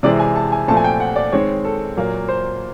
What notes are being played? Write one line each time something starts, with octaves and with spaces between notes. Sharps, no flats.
C3 E3 G#3 C4 D5
G#5
A5
G#5
A#2 F3 A3 C4 A5
G#5
G5
F#5
D5
D#3 G#3 C4 C#5
A4
A#2 F#3 A#3
C5